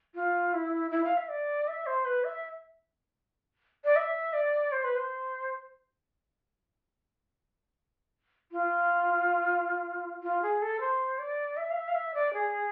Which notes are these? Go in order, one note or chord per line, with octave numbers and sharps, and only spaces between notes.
F4
E4
E4
F5
E5
D5
E5
C5
B4
E5
D5
E5
D5
C5
B4
C5
F4
F4
G#4
A4
C5
D5
E5
F5
E5
F5
E5
D5
G#4